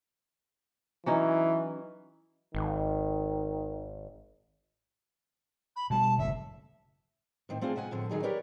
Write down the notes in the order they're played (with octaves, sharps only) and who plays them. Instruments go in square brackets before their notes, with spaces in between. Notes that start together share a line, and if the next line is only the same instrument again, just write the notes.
[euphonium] E3 [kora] F#3 C#4 D#4
[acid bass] G#1 [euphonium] D#3
[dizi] B5
[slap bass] B2 G3 [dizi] A5
[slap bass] F#1 A2 [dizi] E5
[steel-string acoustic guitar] A2 D#3 C4
A3 C4 D4 F4 G#4
C3 G#3 F#5 G#5
A2 D3 F3 C4
D3 D#3 F#3 D#4 G#4
G4 A#4 B4 C#5 D5 G5